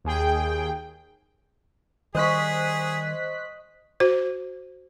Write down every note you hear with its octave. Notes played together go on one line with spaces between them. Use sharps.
D#2 G#4 G5
D#3 G3 G#4 C5 D#5 C#6 F#6 B6
F#4 C5